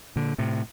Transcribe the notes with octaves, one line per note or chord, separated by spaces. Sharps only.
A#2 D3
A2 C3